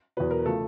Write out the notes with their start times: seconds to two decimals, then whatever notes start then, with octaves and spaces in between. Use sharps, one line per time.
0.17 E2 B2 F#3 B4
0.31 A#4
0.46 C#3 F3 A3 A4